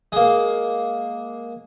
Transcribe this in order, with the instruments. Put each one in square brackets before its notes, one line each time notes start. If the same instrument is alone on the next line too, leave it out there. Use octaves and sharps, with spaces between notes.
[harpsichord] G#3 A#3